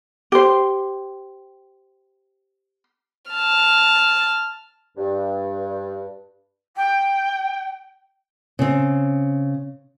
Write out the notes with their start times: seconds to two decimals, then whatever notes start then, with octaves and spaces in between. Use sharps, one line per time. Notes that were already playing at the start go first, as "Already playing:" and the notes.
0.32 G4 C5
3.31 A5 F6
4.97 G2
6.76 G5
8.59 C#3 C4